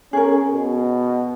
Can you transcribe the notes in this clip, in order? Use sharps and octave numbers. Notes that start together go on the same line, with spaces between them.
C#4 G#4 A#4
B2